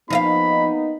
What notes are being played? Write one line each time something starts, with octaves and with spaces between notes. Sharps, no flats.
F3 A#3 B3 D#4 D#5 F5 B5